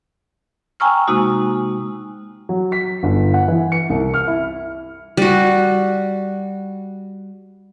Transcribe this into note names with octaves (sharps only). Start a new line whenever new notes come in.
G5 G#5 A#5 C#6 E6 F6
C3 G#3 A#3 D#4 F#4
F#3
B6
G1
F#5
E3
C#7
C2
F6
E4
G3 F#4